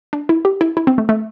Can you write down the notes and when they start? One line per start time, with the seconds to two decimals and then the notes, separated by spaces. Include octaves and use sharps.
0.13 D4
0.29 E4
0.45 G4
0.61 E4
0.77 E4
0.87 C4
0.98 A3
1.09 A3